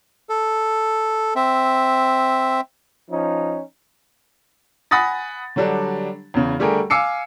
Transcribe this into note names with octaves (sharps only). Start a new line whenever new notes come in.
A4
C4 E5
F3 C#4 D#4
F#5 G#5 B5 D#6 A6 A#6
D3 F#3 G3 D4
E2 C#3
D3 G3 A3 G4 G#4 A#4
F5 G#5 D6 E6 C7 C#7